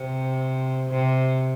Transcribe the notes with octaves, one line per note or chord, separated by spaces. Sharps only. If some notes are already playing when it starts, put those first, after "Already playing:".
Already playing: C3
C3